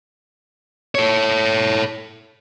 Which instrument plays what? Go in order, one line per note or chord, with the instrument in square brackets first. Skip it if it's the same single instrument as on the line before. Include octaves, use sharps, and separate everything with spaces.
[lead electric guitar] A4 C#5